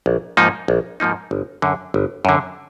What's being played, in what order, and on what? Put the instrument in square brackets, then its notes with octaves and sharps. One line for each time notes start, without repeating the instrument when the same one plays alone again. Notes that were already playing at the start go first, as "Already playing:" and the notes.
[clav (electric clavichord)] A#1
G#2 F3 A#3 D#4
A#1
G#2 F3 A#3 D#4
G1
F#2 D3
G1
F#2 D3